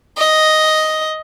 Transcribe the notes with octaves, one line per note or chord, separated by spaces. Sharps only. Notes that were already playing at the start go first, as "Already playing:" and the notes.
D#5